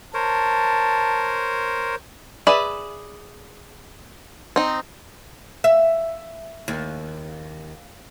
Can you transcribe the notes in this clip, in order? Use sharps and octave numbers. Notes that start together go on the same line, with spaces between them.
A#4 C5 C#5 A5
G#4 B4 D5 E5
C4 D#4
E5
D#2